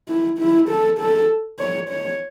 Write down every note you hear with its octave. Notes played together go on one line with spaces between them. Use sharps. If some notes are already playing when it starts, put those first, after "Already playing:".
E4
E4
A4
A4
C#5
C#5